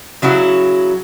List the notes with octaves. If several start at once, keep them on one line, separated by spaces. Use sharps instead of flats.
C#3 F#3 E4 F#4